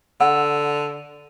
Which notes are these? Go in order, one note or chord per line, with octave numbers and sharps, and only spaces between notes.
D3 F#5 E6